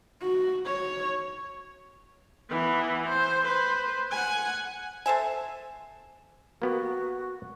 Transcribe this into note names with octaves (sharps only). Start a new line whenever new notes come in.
F#4
C#5
E3 B3
C5
B4 C5
F#5 G#5
A4 C5 E5 G#5
A#3 B3 F#4 G4